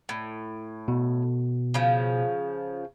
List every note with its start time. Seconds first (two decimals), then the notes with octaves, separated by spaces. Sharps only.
0.09 A2
0.88 B2
1.74 C#3 F3